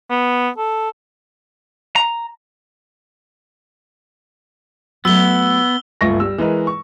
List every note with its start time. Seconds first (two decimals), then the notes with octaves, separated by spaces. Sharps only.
0.10 B3
0.58 A4
1.96 A#5
5.05 F#3 A3 B3 E6 G7
6.01 G1 C#2 A3 C#6 A#6
6.20 G3 E6
6.38 E3 G#3 A#4 B4
6.67 C#6